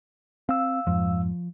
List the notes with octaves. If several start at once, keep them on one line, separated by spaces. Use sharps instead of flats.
C4 F5 E6
F2 G#2 F3